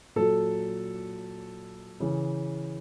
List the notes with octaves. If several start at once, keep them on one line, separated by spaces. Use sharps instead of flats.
A#2 F#3 A4
C#3 E3